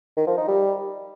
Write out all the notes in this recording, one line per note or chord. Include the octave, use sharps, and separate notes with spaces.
D#3
F3
D#4
G3